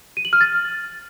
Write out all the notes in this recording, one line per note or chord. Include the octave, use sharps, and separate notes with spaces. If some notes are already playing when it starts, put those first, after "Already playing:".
D#7
F#7
F6
A6